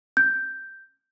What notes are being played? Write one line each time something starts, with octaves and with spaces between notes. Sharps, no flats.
G6